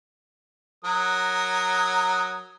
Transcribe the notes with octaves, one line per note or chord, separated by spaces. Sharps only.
F#3 A#4 D#6